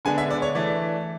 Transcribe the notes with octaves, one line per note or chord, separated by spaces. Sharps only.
D3 G#3 B3 D4 G#5
E5
D5
C#5
E3 A3 D4 D5